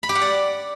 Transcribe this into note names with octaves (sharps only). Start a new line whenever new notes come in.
B5
G4
F#5
D5